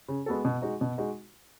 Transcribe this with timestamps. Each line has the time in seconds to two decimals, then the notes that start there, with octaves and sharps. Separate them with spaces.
0.08 C#3
0.26 G#3 B3 F#4 A4
0.45 B2
0.62 G#3 D#4 F#4
0.81 B2
0.98 G#3 D#4 F#4